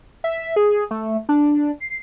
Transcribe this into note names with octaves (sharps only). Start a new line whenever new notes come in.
E5
G#4
A3
D4
C7